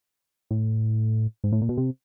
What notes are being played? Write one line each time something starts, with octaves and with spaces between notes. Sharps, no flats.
A2
G#2
A2
A#2
B2
C3